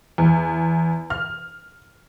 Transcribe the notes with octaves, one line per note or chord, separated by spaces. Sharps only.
E2
F6